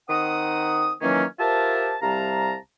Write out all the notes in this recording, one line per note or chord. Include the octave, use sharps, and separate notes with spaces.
D#3 C4 D#4 F#5 D#6
D#3 E3 F#3 A#3 C#4
F4 G4 A#4 C5 E5 A5
C2 C3 G3 F5 A5 A#5